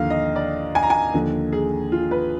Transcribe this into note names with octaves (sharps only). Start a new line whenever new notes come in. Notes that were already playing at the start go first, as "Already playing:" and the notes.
Already playing: D#2 D3 F3 F5
D#5
D5
G#5
A#5
G#5
D#2 D3 F3
G#4
F4
B4